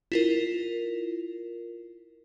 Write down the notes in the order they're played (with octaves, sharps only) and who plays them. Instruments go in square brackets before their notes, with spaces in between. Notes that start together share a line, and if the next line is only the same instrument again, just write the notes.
[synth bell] E4 F4 A#4